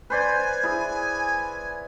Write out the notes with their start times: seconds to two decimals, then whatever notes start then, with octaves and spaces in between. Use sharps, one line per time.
0.10 B4 C5 D5 G#5
0.63 E4 G#4